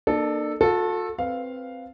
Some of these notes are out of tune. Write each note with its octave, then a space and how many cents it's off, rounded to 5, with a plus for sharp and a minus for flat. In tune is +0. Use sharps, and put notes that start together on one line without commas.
A#3 +5 D4 +35 A4 -5
F#4 -45 A4 +0
C4 +0 B4 +0 F5 +0